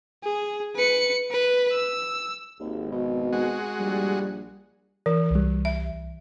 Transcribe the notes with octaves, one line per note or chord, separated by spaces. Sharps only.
G#4
B4 C#7
B4
E6
G#1 D#2
B2
G#3 F#4
A#1 G3
E3 A#4
C2 G3
E5